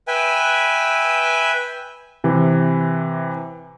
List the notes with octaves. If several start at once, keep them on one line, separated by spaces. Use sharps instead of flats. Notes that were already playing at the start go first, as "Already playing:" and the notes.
B4 E5 G5 G#5
C3 E3